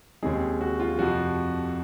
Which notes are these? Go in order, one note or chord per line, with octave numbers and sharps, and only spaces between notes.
D#2 C#3 G#3 C4 G#4
F#4
F4
F2 C3 F3 F#4